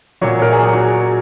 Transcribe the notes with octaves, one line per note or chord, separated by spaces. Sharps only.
A#2 F#3 C#5
A#4
G#4
G#4
F#4